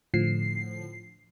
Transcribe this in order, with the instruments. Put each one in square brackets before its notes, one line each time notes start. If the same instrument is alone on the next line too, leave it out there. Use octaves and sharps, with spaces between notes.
[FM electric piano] A2 D3 F3 C7